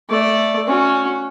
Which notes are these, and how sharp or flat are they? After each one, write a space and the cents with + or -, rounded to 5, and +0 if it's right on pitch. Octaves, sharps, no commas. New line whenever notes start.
A3 +0 D5 +0
C#4 +0 F#4 -20